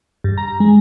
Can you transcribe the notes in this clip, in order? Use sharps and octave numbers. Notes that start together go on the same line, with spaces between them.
G2
A#5
G#3